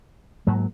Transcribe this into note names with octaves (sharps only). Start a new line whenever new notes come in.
G#2 F#3 A#3